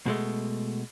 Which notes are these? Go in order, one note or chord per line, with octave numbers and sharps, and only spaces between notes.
B2 G#3 A3